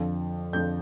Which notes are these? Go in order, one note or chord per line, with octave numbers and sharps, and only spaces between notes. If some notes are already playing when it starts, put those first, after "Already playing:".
Already playing: F2 D3 F3
F2 D3 F3 G6